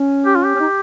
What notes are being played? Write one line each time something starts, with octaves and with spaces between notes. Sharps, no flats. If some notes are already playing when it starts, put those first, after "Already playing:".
Already playing: C#4
G4
F4
G4
C#4
D#4